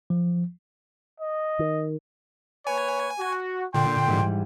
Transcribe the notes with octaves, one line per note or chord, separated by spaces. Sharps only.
F3
D#5
D#3
A#3 B4 C#5 G#5
F#4
A#2 D3 G5 C6
G#2 E3 G3